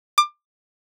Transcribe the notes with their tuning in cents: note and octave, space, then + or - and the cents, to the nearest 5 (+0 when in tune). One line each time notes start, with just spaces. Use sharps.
D6 +25